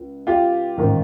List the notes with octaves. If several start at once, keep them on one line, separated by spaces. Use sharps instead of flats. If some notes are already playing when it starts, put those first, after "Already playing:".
Already playing: C#2
F4 G4
A1 G#2 D#3